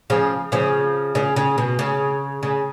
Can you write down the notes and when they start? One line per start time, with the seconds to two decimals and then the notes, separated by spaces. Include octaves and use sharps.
0.10 C#3 F3
0.52 C#3 F3
1.15 C#3
1.36 C#3
1.58 B2
1.79 C#3
2.43 C#3